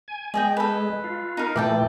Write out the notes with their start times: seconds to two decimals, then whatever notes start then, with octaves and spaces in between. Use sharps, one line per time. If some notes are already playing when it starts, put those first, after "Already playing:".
0.08 G#5
0.34 G#3 G#4 D#5 G5
0.57 A4 B4
1.04 F4
1.37 D#4 A#4
1.56 A#2 E3 A3 D5 G5 A5